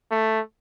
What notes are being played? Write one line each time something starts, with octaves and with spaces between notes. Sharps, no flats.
A3